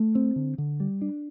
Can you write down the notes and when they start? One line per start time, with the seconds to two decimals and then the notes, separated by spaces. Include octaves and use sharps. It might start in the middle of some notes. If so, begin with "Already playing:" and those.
Already playing: A3
0.15 C4
0.36 D3
0.58 D3
0.80 G3
1.02 D4